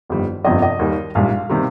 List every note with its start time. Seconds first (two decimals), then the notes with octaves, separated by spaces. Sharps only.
0.10 G1 F2 D#3 G3
0.44 G1 F2 C3 F3 D#5
0.62 D#5
0.79 D#2 D#3 G3
1.15 A#1 G#2 G3 F5
1.49 C3 D#3 G3